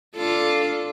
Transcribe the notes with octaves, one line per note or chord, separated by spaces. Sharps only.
D4 F4 A4